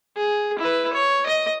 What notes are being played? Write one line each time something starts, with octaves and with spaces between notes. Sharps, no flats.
G#4
E4 B4
C#5
D#5